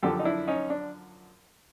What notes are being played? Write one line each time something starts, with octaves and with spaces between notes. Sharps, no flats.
F#2 D3 F3 G4 A4
D#4
D4 E4
C#4 D#4
D4